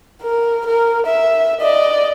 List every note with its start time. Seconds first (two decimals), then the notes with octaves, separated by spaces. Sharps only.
0.22 A#4
0.66 A#4
1.06 E5
1.61 D5 D#5